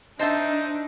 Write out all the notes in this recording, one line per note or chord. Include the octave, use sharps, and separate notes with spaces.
D4 D#4 C5 D#5 E5 A5 A6